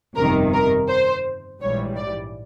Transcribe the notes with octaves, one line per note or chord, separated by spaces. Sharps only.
G1 F2 C3 D#3 A#4
A#4
C5
A#1 G#2 E3 G3 C#5
D5